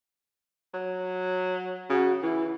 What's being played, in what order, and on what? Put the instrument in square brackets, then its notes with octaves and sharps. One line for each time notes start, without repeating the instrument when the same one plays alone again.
[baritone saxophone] F#3
[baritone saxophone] C#3 [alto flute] F#4
[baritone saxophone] E3 [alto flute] E4